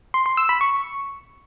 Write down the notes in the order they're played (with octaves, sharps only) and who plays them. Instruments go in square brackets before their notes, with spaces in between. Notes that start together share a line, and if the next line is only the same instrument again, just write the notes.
[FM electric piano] C6
C6
E6
B5
C#6